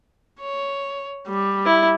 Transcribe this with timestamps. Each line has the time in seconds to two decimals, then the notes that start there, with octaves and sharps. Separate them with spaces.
0.40 C#5
1.28 G3
1.65 E4